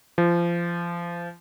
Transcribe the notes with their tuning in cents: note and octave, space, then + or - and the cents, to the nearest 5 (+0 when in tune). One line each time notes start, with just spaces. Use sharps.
F3 -25